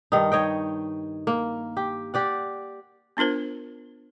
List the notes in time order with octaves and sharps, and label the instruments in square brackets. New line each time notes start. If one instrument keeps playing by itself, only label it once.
[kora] G2 D#3 D#4
C#5 D#5 G5
A#3
G4
G4 D5 F#5
[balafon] B3 D4 F4 A#4 C5